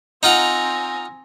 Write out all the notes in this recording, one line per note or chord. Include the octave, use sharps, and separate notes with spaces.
C4 D#4 F4 F#5 G#5 A#5